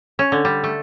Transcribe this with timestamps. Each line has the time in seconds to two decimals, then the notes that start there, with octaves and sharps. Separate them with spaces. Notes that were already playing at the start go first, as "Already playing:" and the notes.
0.19 C#4
0.32 D3
0.45 G3
0.64 A3